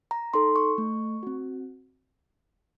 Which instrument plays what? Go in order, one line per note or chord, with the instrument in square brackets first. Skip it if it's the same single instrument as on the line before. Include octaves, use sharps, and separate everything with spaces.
[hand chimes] A#5
D#4 A4 C6
C#6
A3
C4 F#4